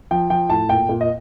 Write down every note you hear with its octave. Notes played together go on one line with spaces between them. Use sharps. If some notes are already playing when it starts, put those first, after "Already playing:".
F3 G5
F3 G5
A2 A5
A#2 G5
A#2
D#5